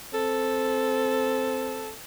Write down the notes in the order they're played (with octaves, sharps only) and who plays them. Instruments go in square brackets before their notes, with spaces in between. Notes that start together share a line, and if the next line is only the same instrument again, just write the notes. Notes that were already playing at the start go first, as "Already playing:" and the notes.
[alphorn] C4 [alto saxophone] A4